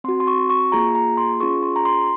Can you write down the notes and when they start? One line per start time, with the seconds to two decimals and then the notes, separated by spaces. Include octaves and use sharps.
0.04 C4 F#4 C6
0.20 C6
0.27 C#6
0.50 C#6
0.72 A#3 F4 G#4 A#5
0.95 A#5
1.17 C6
1.40 C#4 F4 G#4 C#6
1.63 C6
1.76 A#5
1.85 C6